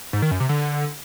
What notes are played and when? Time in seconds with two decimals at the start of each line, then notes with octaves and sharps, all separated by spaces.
0.13 G#2
0.22 D#3
0.31 F#2
0.40 C3
0.49 D3